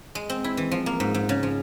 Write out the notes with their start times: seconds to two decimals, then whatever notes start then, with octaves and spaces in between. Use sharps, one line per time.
0.15 G#3
0.30 C4
0.44 E4
0.57 E3
0.71 F3
0.86 A#3
1.00 G#2
1.14 G#2
1.29 C#3
1.43 F3